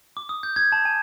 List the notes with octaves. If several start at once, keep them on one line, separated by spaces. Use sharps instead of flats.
D6
D#6
G6
G#6
A5
G#5